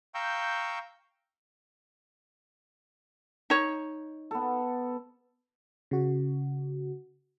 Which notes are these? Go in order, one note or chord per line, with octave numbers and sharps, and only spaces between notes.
F5 G5 A#5 C#6 E6 G6
D#4 C#5
B3 A4
C#3 F#4